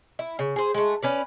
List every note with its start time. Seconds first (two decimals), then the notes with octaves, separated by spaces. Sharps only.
0.19 E4
0.39 C#3
0.56 G#4 C5
0.74 G#3 A3
1.03 C#4 B4 D5